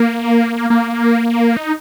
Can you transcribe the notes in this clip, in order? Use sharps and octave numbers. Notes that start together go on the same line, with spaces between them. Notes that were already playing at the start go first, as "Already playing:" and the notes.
Already playing: A#3
A#3
D#4